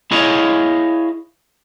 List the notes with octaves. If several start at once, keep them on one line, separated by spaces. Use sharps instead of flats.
E4 G#4 C#5 D#5 F5